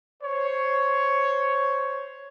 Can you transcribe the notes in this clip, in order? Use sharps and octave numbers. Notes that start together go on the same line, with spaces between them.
C5 C#5